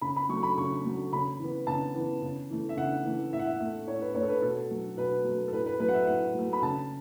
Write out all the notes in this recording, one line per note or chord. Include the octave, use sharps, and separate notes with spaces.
C#3 B5
B5
F#3 A3 C#6
B5
C#3 C#6
F#3 A3
C#3 B5
E3 B3
C#3 A5
E3 B3
C#3
E3 A3
E5
C#3 F#5
E3 A3
A2 E5
F#5
E5
A3
A2 C#5
B4
A3 C#5
A4
B4
B2 A4
F#3 A3
B2 B4
F#3 A3
A4
A2 B4
B4
F#3 A3 B4
F#5
E5
A2 F#5
F#3 A3
B5
C#3 A5